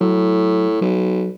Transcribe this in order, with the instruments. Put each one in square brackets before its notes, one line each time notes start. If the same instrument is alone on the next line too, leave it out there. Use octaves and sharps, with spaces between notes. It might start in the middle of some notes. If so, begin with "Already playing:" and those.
[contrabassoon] A2 [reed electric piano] F#3
[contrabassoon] B1 [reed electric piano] F#3